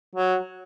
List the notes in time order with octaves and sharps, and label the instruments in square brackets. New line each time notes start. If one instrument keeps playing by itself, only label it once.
[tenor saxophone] F#3